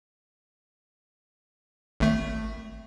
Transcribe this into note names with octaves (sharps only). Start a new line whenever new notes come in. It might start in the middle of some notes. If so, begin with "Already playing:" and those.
G#1 A3